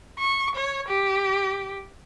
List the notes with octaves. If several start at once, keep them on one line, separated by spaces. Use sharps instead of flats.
C#6
C#5
G4